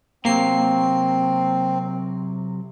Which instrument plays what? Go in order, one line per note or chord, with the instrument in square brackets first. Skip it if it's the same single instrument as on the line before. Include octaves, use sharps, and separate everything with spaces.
[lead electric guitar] C3 F#3 [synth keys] A#3 C7 [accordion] C4